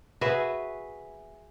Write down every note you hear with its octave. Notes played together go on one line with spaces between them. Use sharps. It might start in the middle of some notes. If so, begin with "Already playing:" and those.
F#4 G#4 B4 E5